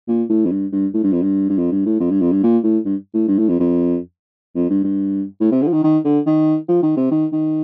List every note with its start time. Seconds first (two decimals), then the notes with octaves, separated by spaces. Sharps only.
0.08 A#2
0.29 A2
0.46 F2
0.51 G2
0.72 G2
0.94 A2
1.04 G2
1.12 F2
1.22 G2
1.50 G2
1.58 F2
1.72 G2
1.86 A2
2.00 F2
2.11 G2
2.21 F2
2.32 G2
2.43 A#2
2.64 A2
2.85 G2
3.14 A2
3.28 G2
3.38 A2
3.49 F2
3.60 F2
4.55 F2
4.70 G2
4.84 G2
5.41 A2
5.52 C3
5.62 D3
5.68 F3
5.73 D#3
5.83 D#3
6.05 D3
6.26 D#3
6.69 F3
6.83 D#3
6.97 C3
7.11 D#3
7.32 D#3